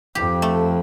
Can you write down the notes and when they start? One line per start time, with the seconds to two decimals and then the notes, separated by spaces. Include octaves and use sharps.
0.15 F2 G4
0.42 A3